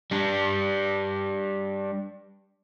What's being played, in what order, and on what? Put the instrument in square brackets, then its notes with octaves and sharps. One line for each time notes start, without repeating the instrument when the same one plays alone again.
[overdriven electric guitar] G3 D4